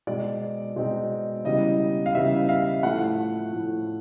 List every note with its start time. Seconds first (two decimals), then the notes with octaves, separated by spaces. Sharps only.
0.07 B2 G#3 C4 D#4 D5
0.76 B2 G#3 C4 D#4
1.45 C#3 E3 G3 B3 D#4 D#5
2.06 F5
2.15 C#3 E3 G3 B3 D#4 E5
2.49 F5
2.83 A2 F3 A3 F#5
3.53 A2 F3 A3